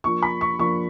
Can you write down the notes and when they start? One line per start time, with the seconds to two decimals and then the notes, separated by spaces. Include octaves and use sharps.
0.04 F3 A#3 D4 F4 C#6
0.23 B5
0.41 C#6
0.59 F3 A#3 D4 F4 C#6